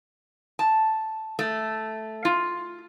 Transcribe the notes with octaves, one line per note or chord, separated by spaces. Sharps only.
A5
A3
F4